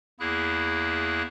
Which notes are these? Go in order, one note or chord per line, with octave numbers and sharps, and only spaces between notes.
E2 A#3 E4 G#4 F#6